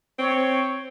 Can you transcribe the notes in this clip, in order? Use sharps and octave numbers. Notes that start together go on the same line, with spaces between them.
C4 C#5